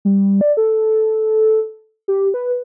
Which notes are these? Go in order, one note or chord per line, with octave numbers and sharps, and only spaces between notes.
G3
D5
A4
G4
B4